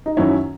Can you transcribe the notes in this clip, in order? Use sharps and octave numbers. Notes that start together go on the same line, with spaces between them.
D#4
F#2 D#3 F#3 C#4 E4